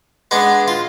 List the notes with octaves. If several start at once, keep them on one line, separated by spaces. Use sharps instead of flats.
G#3 B3 D4
F4